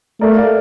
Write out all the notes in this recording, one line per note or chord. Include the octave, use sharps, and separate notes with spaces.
A3 A#4 D5
D5 F5